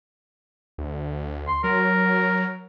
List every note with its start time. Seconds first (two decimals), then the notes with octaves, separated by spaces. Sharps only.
0.78 D2
1.47 C6
1.64 F#3 A#4